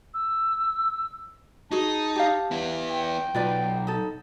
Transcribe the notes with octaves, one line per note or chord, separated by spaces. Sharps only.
E6
D#4 F#4 G#4 A5
G4 F5
B3 E4
G5
B1 F4 B4 D5
D#4 A4